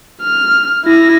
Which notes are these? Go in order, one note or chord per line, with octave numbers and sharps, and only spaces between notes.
F6
E4 A#6